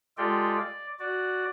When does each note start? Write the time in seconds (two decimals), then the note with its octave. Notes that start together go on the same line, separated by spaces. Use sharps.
0.18 G#3 F4 G4 A4 D5 G5
0.60 D5
0.99 F#4 D5